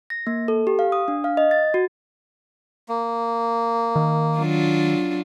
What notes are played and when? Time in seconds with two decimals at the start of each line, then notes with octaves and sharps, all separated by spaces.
0.10 A#6
0.27 A#3
0.48 A4
0.67 G4
0.79 F5
0.92 D#6
1.08 D4
1.24 F5
1.37 D#5
1.51 A6
1.74 F#4
2.88 A#3
3.95 D#3
4.38 F#3 D4 F4